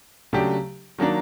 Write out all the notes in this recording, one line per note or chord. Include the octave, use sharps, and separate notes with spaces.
C#3 F#3 A3 D4 G4
D#3 F#3 A#3 D4